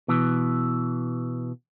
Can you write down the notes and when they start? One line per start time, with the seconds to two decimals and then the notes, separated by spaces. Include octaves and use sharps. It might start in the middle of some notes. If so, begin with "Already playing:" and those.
0.08 B2 E3